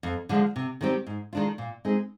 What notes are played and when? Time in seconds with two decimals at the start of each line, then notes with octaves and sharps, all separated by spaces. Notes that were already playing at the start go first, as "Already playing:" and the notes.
0.03 F2
0.29 D3 F3 G#3
0.56 C3
0.81 D#3 G3 C4 G4
1.06 G#2
1.33 D#3 G#3 D4 F4
1.58 A#2
1.85 G#3 C4 D#4 G#4